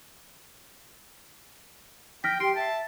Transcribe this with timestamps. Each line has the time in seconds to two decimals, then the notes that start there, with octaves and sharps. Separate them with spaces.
2.24 G5 F6 A#6 B6
2.40 G4 C6 D7
2.56 E5 A5